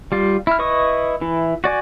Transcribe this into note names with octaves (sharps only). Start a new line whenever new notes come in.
G3 F4
E4 F6
E4 B4 D#5 C#6 D#6
E3 E4
F#4 D5 G#5